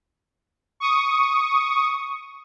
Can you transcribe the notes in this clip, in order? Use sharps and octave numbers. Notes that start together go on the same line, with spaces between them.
C#6 D#6